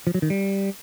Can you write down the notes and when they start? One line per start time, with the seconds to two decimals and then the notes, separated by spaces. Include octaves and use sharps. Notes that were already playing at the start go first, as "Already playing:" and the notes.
0.07 F3
0.15 F#3
0.22 D#3
0.30 G3